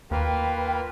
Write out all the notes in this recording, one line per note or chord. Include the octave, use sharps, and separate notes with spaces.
D#2 A#3 F4 B4 G5